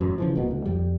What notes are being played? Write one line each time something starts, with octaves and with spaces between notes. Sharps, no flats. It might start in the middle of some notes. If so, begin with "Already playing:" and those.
A1 F#2
C#3 E3 F3
D1 C2 B2 A#3
D2
F2 G3